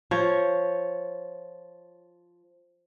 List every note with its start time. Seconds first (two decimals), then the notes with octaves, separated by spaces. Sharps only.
0.11 F3 C#5